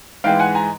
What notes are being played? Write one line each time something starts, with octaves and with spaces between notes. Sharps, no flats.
G#2 E3 G#3 F5 G5
F#5 G#5
G#5 A#5